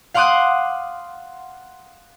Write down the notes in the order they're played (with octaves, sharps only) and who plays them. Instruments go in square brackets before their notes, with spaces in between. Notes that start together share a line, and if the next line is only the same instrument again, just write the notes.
[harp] F5 F#5 C6 D6 D#6 F#6